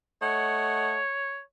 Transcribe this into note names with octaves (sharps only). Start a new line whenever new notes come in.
A3 C#5 D#5 F#5